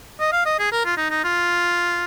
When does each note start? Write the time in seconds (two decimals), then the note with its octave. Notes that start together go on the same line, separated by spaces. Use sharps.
0.20 D#5
0.32 F5
0.45 D#5
0.59 G#4
0.72 A#4
0.85 F4
0.97 D#4
1.10 D#4
1.24 F4